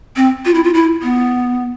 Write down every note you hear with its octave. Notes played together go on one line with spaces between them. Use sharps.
C4
F4
E4
F4
E4
B3